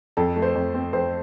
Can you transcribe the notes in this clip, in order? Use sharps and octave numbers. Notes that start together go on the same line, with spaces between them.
F2 A4
A3
C5
F2
C4
F2 C5